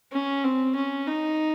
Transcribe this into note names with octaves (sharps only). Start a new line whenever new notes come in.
C#4
C4
C#4
D#4